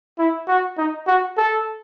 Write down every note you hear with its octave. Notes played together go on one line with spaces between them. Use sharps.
E4
F#4
D#4
F#4
A4